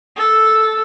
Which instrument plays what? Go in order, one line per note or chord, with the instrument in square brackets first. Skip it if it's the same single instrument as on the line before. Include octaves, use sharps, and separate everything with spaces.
[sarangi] A4